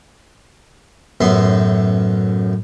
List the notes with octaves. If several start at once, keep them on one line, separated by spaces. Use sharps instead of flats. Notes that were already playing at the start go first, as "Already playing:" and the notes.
A1 F#2 B3 E5 C6